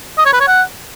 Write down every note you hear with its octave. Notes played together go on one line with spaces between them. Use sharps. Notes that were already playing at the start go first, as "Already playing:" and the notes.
D#5
C#5
B4
C#5
F#5